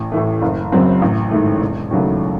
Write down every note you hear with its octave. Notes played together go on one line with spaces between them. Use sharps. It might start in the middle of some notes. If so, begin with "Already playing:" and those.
Already playing: A1
A2 E3 A3
F#1
F#2 C#3 F#3 C4
A1
G#2 D#3 A3
E1
D#2 C#3 F#3 A3